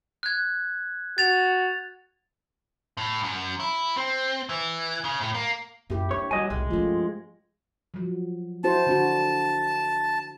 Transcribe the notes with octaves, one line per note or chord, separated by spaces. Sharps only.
F#6 G#6
F#4 A6 F7
A2
F#2
E4
C4
E3
C#3
A2
A#3
F#2 A#3 E4 G4
D4 C#5
F#3 G3 D#5 G#5
B1 G#3
G2 F3 A3 C#4 F4
F3 F#3
E4 F#4 C5 A5
D3 D4 F#4